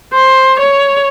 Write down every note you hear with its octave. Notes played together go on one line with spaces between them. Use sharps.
C5
C#5